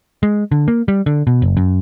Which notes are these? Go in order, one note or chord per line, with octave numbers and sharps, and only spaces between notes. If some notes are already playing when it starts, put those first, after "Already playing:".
G#3
D3
A#3
G3
D3
B2
F#1
F#2